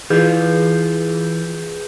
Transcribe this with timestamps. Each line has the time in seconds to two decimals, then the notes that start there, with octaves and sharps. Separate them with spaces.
0.10 E3 F4 G#4 B4 G6